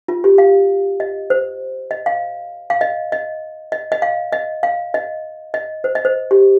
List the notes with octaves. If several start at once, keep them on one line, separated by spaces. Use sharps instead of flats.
F4
G4
F5
D#5
C5
D#5
F5
F5
D#5
D#5
D#5
D#5
F5
D#5
F5
D#5
D#5
C5
D#5
C5
G4